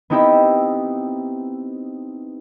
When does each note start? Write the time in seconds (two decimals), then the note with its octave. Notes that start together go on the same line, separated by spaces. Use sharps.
0.10 B3 C4 D#4 E4 G4 E5